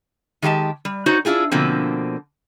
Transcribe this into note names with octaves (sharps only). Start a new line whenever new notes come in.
D#3 G#3 G4 F5 A5
G3
D#4 F#4 C5 C#5
D4 E4 F4 G#4 A#4
B2 D3 F3 A#3 C4